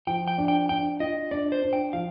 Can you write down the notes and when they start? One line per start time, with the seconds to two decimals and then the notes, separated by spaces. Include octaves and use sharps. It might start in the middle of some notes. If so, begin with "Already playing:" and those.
0.07 F3 G5
0.28 G5
0.38 D4
0.48 G5
0.69 D4 G5
1.00 F4 D#5
1.31 D4 D5
1.52 C5
1.62 D4
1.73 G5
1.93 F3 F5